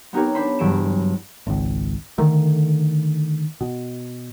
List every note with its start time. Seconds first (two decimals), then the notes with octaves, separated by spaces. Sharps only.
0.13 B3 C4 D#4 G4 A#4 C#5
0.35 D4 C5 B5
0.59 F#1 G2 C#3 E3 D7 E7
1.47 G#1 C#2
2.18 D3 D#3 A3
3.61 B2